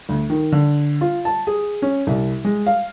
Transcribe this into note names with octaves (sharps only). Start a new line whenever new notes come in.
D2
D#3
D3
F4
A5
G#4
C#4
C2
G#3
F5